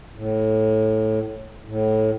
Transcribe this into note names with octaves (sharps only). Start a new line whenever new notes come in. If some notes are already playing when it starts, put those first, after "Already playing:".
A2
A2